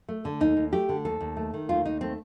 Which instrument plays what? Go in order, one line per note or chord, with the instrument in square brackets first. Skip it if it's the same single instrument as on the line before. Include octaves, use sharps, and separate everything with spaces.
[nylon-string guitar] A3
D3
D#2 D#4
D#2
A3 G4
D3
D#2 A4
D#2
A3
D#3
D#2 F4
D#2 D#4
A3 C4